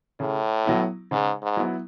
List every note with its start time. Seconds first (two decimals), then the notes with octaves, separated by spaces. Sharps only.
0.20 A2 C#3
0.65 F#3 B3 E4
1.11 G#2 C#3
1.42 G#2
1.57 F#3 B3 E4